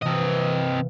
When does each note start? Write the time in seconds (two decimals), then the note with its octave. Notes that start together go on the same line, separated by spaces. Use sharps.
0.02 C3 E3 A#3 C4 D#5